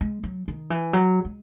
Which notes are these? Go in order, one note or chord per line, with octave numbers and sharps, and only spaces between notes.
G#3
F#3
D#3
E3
F#3
G#3